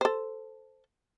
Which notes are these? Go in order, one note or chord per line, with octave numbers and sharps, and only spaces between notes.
A4 C5